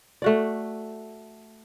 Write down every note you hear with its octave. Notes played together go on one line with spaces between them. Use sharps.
A3 F#4 D5